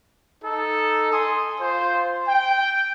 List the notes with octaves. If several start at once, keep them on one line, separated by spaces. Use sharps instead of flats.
D#4 A4
G#5 C6 D#6
F4 C5
G5